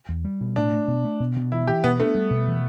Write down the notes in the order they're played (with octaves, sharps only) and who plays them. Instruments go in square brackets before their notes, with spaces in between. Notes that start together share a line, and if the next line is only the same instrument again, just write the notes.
[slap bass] E2
G3
B2
[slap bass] A2 [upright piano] D4
[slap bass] A3
B2
A3
B2
B2
[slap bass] E3 [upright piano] E4
[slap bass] E3 [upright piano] G4
[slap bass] B2 [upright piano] B3
[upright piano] A3 [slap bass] D4
[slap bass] G3
B2
E3